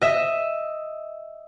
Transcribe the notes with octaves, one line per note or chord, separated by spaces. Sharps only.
D#5 E5